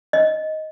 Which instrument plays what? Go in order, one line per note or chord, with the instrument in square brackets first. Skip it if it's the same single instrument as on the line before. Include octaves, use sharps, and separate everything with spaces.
[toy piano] D#5